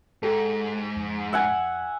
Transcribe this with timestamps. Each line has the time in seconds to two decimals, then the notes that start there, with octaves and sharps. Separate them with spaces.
0.23 G#2 G4 A4
0.97 F2
1.33 E5 F#5 G#5